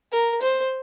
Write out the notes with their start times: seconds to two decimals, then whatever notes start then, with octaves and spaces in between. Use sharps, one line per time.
0.12 A#4
0.42 C5